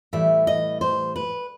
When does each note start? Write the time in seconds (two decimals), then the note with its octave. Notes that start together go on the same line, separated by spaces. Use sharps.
0.13 A2 E3 G3 E5
0.47 D#5
0.81 C5
1.16 B4